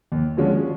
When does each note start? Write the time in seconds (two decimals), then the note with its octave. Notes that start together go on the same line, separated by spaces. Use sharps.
0.12 D#2
0.37 D3 F3 G#3 C#4